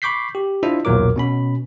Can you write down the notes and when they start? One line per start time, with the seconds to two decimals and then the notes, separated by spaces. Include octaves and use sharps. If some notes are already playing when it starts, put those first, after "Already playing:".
0.02 B5 C#6 D6 G6 B6 C7
0.35 G4
0.63 D4 E4 F4 C5 D#5 E5
0.85 B1 E2 A#2 F#3 A#4 D6
1.16 B2 C#4 B5